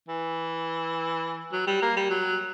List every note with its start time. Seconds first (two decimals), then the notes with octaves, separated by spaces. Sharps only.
0.08 E3
1.52 F#3
1.67 G3
1.82 A#3
1.96 G3
2.10 F#3